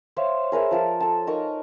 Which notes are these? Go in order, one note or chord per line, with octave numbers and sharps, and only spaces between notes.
C5 C#5 E5 F5
G#4 A#4 B4 E5
F3 A#4 A5
A4 A5
D#4 A#4 C#6